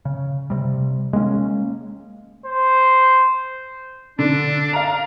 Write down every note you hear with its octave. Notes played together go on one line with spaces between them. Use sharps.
C#3
C3 G3
G#3 A#3 B3 C#4
C5
D3 D4
F5 A#5